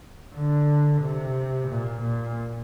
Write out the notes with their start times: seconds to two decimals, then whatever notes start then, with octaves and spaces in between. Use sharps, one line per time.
0.35 D3
1.01 C3
1.68 A#2
2.02 A#2